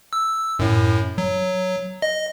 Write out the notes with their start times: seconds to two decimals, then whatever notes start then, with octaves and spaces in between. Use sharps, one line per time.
0.13 E6
0.59 F#2 A2
1.18 F#3
2.02 D#5